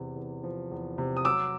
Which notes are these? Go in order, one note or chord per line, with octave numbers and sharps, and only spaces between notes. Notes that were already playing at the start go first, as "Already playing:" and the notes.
Already playing: E2 C3
E2
F3
E2
C3
D#6
F#3 D6 E6